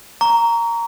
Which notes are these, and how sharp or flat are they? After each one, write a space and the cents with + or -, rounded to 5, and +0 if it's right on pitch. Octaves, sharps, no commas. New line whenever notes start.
A#5 -5 C#6 +35